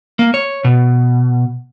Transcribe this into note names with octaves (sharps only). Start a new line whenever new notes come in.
A#3
C#5
B2